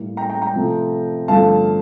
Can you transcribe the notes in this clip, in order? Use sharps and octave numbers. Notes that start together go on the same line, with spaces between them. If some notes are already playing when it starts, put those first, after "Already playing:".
Already playing: A2 G3 A#3
G5 A#5
G5 A#5
G5 A#5
C3 F3 A3 C4
G2 D3 F3 A3 C4 F5 A5